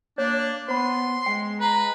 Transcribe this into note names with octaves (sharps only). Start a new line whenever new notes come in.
A#3 D4 C#5
B3 C5 B5 C6
G#3 G5
B4 A#5